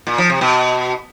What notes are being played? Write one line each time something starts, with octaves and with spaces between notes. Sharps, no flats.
A#2
F3
C3
B2